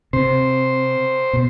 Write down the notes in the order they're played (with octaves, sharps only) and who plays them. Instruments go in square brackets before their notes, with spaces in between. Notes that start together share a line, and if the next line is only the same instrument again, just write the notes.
[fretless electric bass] C3 [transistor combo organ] C5
[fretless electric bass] B2